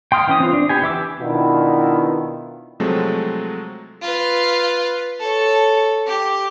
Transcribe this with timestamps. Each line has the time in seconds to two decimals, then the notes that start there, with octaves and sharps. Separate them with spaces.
0.12 G5 C6 D#6 F6
0.28 E3 C#4 D#6
0.40 C4 F4
0.53 D4
0.69 B3 G4 G#5
0.82 E3 E5 D6 E6
1.22 B2 D#3 B3 D4 E4 F4
2.80 C3 F3 F#3 G#3 A3 C4
4.01 F4 B4
5.19 A4 C#5
6.07 G4